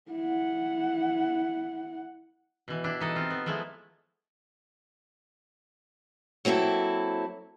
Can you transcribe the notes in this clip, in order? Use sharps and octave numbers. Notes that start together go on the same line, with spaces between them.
E4 F#5
B2 E3
D4 E4 G4
E3 D#4 A4
C4 F4
B3
F3 G#3 A3 E4
F#3 A#3 C4 E4 A4